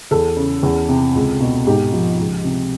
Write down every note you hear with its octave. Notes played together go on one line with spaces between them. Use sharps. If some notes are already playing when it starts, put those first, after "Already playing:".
E2 A4
C#3
E2
C3
C#2
B2
G#2 G4
F3
C#2
C3